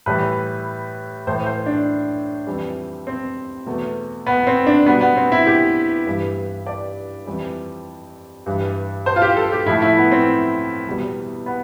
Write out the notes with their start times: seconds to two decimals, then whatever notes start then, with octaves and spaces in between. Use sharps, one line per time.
0.06 A2 E3 G3 B4
1.27 A2 E3 A3 C5
1.46 C5
1.66 D4
2.47 F2 E3 G3
3.07 C4
3.66 E2 B2 A3
4.26 B3
4.47 C4
4.67 D4
4.86 B2 G3 B3
5.01 B3
5.16 C4
5.32 E4
5.47 G4
6.07 G2 E3 G3
6.67 D5
7.26 F2 E3 G3
8.46 G2 E3 G3
9.06 C5
9.16 F4
9.22 G4
9.36 A4
9.52 G4
9.66 A2 F3 A3 E4
9.82 E4
9.97 B3
10.12 C4
10.87 E2 B2 G3
11.46 B3